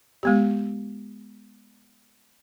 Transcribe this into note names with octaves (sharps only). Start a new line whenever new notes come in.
G#3 B3 G4